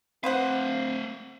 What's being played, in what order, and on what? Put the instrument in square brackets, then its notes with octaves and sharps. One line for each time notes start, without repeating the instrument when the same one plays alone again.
[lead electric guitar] A3 F5 [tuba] C4 [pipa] B4 C5 F#5